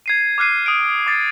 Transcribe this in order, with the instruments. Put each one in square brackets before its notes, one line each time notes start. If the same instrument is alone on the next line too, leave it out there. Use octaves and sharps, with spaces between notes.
[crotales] G#6 C7 D#7
D6 F6 F#6 C7 D#7
D#6 D7
D6 A6 C7